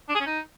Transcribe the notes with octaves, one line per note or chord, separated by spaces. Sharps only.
D4
G#4
C#4
D#4